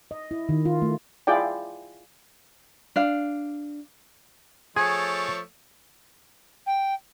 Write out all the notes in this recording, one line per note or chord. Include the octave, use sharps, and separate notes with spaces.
D#5
E4
D#3
F4
A3
E4 F4 G#4 D5 G5
D4 F5
F3 A3 G#4 C#5
G5